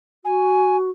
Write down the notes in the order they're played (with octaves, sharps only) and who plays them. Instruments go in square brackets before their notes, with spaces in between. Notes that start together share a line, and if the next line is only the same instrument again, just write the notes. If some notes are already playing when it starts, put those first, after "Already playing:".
[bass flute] F#4 [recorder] G#5